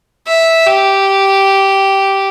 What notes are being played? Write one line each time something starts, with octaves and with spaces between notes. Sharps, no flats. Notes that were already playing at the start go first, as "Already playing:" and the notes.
E5
G4